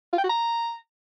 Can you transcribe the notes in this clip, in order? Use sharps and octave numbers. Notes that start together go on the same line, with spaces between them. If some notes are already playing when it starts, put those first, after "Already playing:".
F4
G5
F#4
A#5